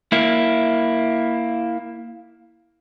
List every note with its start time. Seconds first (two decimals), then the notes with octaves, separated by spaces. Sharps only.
0.12 A#3 E4